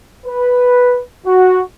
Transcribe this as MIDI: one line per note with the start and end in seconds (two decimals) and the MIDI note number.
0.25 1.01 71
1.25 1.60 66